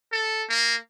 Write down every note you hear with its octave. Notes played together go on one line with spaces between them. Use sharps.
A4
A#3